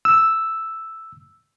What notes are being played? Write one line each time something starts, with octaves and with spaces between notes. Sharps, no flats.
E6